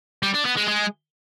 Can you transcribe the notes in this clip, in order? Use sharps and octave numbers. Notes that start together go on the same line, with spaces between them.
G3
D4
B3
G#3
G#3